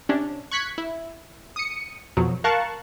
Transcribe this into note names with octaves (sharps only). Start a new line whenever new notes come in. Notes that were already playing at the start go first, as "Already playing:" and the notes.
C3 C#4 D4
C#6 F#6 G#6 B6 C#7
E4
D#6 C#7
F2 B2 F3 F#3
A#4 F5 A5 C#6 F#6